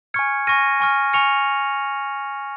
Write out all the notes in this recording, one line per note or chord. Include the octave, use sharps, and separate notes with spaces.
G#5 C#6 F6 G#6 C#7
G#5 C#6 F6 A#6 D#7
G#5 C#6 F6
G#5 C#6 F6 C#7 F7